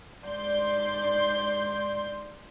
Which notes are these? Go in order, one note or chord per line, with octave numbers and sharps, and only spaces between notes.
G#2 D5 C6 G6